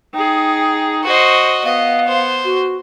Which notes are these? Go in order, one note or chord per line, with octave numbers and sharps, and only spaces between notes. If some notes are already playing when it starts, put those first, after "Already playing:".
D#4 G#4 G5
F#4 C5 D#5 C#6
B3 D#5 F5
C5
F#4